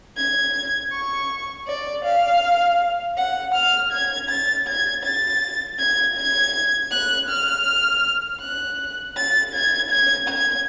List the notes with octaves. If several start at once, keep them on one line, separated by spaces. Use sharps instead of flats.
G#6
C#6
D5
F5
F#5
F6
G#6
A6
G#6
A6
G#6
G#6
F#6
F6
F#6
A6
G#6
G#6
G#6